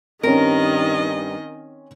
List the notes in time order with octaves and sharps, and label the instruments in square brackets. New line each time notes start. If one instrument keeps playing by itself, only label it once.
[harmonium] G2 G3 [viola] D#3 D#5 [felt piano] C4 C#4 [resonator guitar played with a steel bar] A#4